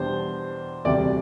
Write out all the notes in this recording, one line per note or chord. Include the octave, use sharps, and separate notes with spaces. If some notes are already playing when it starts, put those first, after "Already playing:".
Already playing: E2 B2 G3 D4 C5
E1 D2 C3 G3 D5